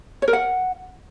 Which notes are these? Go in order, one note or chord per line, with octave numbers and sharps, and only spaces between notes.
C#5
A#4
F#5